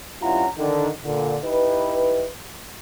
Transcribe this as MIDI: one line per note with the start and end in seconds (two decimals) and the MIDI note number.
0.22 0.46 43
0.22 0.46 61
0.22 0.46 64
0.22 0.46 65
0.22 0.46 78
0.22 0.46 82
0.58 0.88 50
0.58 0.88 51
1.05 1.37 46
1.05 1.37 50
1.44 2.26 63
1.44 2.26 64
1.44 2.26 67
1.44 2.26 71